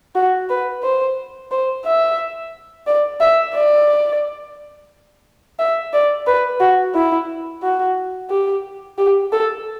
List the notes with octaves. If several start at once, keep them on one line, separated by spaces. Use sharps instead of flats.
F#4
B4
C5
C5
E5
D5
E5
D5
E5
D5
B4
F#4
E4
F#4
G4
G4
A4